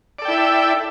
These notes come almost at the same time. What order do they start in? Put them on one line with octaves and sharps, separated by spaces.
D5 A4 G5 E4 E5